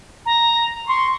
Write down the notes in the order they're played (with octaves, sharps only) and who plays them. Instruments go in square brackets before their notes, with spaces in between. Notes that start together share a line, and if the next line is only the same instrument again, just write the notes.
[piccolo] A#5
[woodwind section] C6 [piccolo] C#6